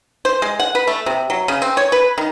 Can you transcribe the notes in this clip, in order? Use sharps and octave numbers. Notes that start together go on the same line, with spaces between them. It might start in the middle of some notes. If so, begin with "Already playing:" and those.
C5
G#3
F#5
B4
A3
C3
F#3
C#3
C4
C#5
B4
D#3